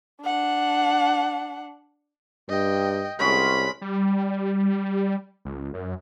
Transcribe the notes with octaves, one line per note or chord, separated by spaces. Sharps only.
D4 F#5
G2 D#5 G5
C2 G#3 C#4 F#4 B5
G3
C#2
F#2